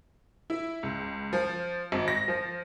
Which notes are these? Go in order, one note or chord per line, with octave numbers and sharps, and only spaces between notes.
E4
C#2
F3
G#1
A#6
F3